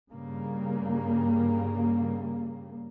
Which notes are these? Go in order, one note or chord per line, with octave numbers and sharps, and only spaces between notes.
G2 C#3 G3 A#3